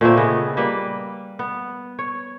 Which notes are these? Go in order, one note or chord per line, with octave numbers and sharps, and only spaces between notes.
A#2 A3 A#3 C4
C#3 B3 G#4 D#5
G3 A#3 B4
B3
C#5